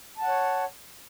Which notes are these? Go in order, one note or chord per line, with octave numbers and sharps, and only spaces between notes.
C#5 F#5 A5